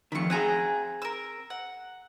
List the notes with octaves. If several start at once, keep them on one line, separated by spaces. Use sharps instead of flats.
F2 D#3 B5 C#6
C4 G#4 F#5 G#5 A#5
A#4 E6
F#5